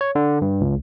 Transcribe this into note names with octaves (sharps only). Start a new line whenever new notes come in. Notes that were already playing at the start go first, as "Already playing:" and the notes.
C#5
D3
G2
C#2